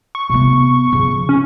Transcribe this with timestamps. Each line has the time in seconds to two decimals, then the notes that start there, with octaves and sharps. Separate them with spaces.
0.15 C#6
0.30 C3 B3
0.93 C#3 F3
1.29 C#4